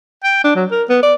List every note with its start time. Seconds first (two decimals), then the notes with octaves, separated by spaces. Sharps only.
0.24 G5
0.44 D4
0.56 F#3
0.71 A#4
0.89 B3
1.03 D5